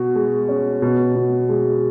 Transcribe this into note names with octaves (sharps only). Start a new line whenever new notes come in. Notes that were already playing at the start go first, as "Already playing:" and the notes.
Already playing: B2 F#4
G#3
C#4
B2
B2
G#3